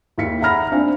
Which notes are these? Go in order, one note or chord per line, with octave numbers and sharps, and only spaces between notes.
D#2 E4 F5 B6 C#7
E5 F#5 A#5 B5 F6 A#6
C4 D4 F5 G#5